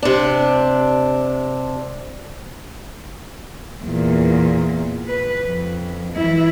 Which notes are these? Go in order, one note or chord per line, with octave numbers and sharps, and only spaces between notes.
C3 D4
E2 A#2
B4
F2
E3 E4